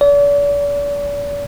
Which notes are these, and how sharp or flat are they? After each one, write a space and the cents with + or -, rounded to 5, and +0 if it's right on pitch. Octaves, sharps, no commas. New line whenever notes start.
D5 -40